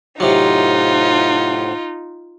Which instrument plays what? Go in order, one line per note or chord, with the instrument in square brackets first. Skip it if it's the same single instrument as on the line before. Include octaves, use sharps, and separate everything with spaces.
[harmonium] A2 C5 F#5 [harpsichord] C3 F#3 [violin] D#4 [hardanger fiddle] F4